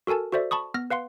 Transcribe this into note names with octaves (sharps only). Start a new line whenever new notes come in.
F#4 A4 A#4 G#5 A5
F#4 A4 C5 D5 E5
A5 B5 C#6 D#6
B3 F6 A#6
B4 F5 F#5 C6